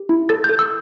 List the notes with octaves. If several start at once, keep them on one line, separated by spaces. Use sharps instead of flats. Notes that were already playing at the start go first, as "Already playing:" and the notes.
Already playing: G4
E4
A4 A6
G6
A4
E6